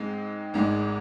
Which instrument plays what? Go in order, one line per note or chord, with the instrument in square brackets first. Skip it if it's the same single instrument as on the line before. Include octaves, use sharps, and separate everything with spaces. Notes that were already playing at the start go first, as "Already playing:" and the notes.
Already playing: [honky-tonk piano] G#2 G#3 C4 D#4
G#1 G#2 G#3